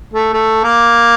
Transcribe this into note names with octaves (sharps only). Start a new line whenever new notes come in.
A3
A3
A#3